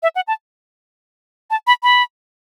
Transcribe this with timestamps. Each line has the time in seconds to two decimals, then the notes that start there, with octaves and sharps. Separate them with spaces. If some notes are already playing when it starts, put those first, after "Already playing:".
0.03 E5
0.16 F#5
0.28 A5
1.50 A5
1.67 B5
1.83 B5